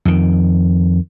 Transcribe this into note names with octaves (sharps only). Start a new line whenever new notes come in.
F2 D#3